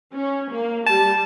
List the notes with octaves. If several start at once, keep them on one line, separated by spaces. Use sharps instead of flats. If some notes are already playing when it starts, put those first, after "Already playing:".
C#4
A#3
G3 A5